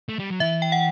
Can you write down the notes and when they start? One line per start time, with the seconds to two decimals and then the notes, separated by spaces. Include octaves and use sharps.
0.09 A3
0.19 G3
0.30 F#3
0.40 E3 E5
0.62 G5
0.72 F#5